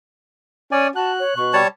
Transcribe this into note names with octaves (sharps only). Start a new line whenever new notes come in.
C#4 D5 G#5
F#4 A5 F#6
C#5
B2 C#6
G3 C#5 A5